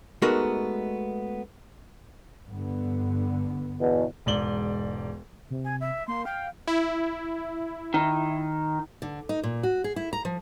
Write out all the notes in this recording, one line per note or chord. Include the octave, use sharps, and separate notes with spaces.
G#3 A3 B3 D#4 F#4 A#4
G2 D3 B3
E2 B2
E1 G#2 D5 F#7 G7
C3
G#5
E5
A#3 C6
F5 G5
E4
D#3
D3
D#4
A#2
F#4
G#4
E4
A#5
F3